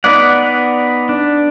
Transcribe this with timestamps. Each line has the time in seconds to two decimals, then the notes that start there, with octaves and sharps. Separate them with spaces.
0.04 B3 D#4 D5 F#5
1.09 D4